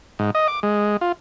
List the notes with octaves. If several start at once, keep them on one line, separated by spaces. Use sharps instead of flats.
G#2
D#5
D6
G#3
F4